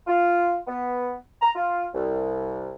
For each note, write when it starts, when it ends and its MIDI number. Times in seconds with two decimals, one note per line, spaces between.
0.07 0.56 65
0.67 1.14 59
1.41 1.50 82
1.55 1.86 65
1.94 2.74 36